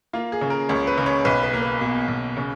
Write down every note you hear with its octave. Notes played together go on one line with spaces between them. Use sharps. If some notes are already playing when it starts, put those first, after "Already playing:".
A#3 F4
G#4
C#3
A#4
C#2 C#5
B4
C#3
C#5
B1 B4
B4
A#3
B4
B2
B1
C#3